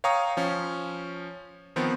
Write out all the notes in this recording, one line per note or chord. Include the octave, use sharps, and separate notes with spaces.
C#5 F5 G5 A#5 C#6 D#6
F3 C#4
D#3 F3 B3 C4